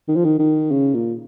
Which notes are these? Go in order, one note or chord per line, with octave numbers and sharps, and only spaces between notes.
D#3
F3
D#3
D#3
C#3
A#2